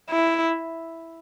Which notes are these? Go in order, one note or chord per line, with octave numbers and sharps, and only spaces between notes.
E4